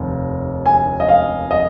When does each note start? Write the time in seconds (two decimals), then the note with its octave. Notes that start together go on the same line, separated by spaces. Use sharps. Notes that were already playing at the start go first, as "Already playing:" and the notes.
Already playing: F1 D#2
0.66 G#5
1.00 D#5
1.09 F5
1.51 D#5